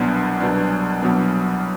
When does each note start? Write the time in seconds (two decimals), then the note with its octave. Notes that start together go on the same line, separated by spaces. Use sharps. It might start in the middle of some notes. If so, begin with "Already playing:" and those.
Already playing: C2 B2 F#3 B3 D4
0.40 C2 B2 F#3 B3 D4
1.02 C2 B2 F#3 B3 D4